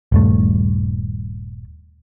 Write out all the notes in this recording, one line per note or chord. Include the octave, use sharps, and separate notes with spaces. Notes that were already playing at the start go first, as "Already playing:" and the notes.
D#1 G2 A3